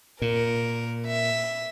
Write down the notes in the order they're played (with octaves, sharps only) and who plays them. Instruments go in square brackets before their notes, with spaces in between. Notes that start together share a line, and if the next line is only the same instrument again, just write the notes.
[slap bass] A#2 [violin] A#4
[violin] E5